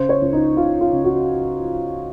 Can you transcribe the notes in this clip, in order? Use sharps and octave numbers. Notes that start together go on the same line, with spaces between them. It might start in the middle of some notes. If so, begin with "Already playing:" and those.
Already playing: C#3 C5
C#5
C#2
D#4
C#3 F4
F4
C#3
F#4